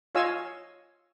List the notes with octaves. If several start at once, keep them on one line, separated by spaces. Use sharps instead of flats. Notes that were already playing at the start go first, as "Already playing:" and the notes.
F4 C#5 D#5 F5 G#5 E6